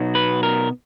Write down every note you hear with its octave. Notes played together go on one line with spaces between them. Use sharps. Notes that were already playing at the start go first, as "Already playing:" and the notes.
Already playing: B2 F#3 B3 D#4
B4
A#4